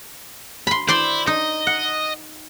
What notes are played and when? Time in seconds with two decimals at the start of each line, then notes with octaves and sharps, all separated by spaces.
0.67 B5 C6
0.88 E4 C5 D5 C6
1.27 D#4 D#5
1.67 F#5